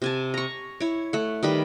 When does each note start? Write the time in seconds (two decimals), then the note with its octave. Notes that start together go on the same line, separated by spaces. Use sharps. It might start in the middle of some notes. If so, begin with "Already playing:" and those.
0.02 C3 G#5 A5
0.34 A#5 C#6
0.80 E4 C#5
1.13 A3 F#5
1.43 D#3 G3 B4 B5